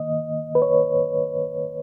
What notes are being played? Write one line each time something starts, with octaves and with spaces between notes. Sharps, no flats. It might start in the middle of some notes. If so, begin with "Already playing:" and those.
Already playing: D#3 A#3 D#5
B4
C#5